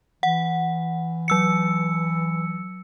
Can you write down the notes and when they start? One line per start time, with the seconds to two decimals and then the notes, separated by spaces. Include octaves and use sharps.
0.23 E3 F#5
1.28 F#3 E6 C#7